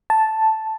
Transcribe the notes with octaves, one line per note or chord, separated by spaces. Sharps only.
A5